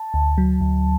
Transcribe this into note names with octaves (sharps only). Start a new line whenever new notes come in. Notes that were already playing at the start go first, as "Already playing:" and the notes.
Already playing: A5
D2
F#3
D2